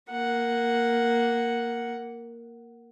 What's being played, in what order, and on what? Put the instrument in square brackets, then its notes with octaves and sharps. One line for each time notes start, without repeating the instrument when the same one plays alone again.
[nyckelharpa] A#3 F#5